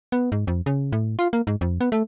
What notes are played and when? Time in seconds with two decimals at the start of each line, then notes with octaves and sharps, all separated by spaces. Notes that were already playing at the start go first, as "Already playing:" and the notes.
0.12 B3
0.32 G#2
0.47 F2
0.66 C#3
0.92 A2
1.19 F4
1.33 A#3
1.47 G#2
1.61 F2
1.81 B3
1.92 A3